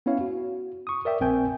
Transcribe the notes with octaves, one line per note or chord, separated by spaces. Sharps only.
B3 C#4 E4 C#5 F5
F#4
C#6 D#6
A#4 D5 E5 G5
A#1 C4 A#4 G5 G#5 G6